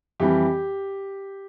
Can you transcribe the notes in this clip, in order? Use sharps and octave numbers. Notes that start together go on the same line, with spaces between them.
F2 E3 G3 G4